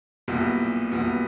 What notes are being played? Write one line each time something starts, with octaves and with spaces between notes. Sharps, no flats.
B1 A#2 G3 B3 E4
B1 A#2 G3 B3 E4